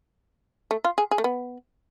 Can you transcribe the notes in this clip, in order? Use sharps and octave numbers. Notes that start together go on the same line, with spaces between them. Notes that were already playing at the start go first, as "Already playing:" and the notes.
A3
F4
G#4
G#4
A3
B3